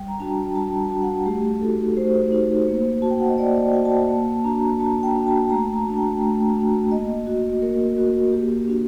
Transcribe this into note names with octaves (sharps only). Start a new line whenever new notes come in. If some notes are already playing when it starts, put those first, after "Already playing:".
Already playing: G3 G5
A#5
D4 F#4 A5
G3 A5
D4 F#4
F#5
A3 G4
D#4 F#4 A4
A3 C5
D#4 F#4
A#3
F#4 A5
G5
F#5
D#5
A#3 D5
D#5
F#4 G5
A5
G5
A#3 A5
D4 F#4 A#5
A#3 A5
G5
D4 F#4
A5
A3 A#5
A5
D4 F#4
G5
A3
D4 F#4
A#3 D#5
F#4
A#3 A#4
F#4
A#3 G4
D4 F#4